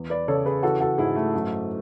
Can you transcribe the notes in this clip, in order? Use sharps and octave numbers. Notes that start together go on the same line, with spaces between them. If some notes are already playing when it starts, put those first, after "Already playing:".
Already playing: E2
B4 D5
C#3 A4 C#5
G#4 B4
E3 F#4 A4
F#4 A4
G#2 E4 G#4
A3
F#2